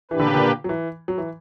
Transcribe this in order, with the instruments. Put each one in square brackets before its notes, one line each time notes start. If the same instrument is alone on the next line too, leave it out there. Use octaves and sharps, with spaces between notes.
[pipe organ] A#2 A#3 D4 G4 B4 [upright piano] E3
[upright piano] D3
C#3
D3
F#3
E3
F#3
E3